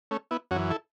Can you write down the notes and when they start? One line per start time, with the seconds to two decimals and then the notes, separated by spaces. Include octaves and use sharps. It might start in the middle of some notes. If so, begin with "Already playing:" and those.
0.11 A3 C#4
0.31 B3 E4
0.51 F#2 C#4 F#4
0.56 E3
0.70 E4 A4